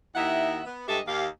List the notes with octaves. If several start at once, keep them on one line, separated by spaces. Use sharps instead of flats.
D#2 D#3 D#4 E4 E5 F#5
B3
G2 G#3 G4 A4 D#5 E5
D#2 G4 F5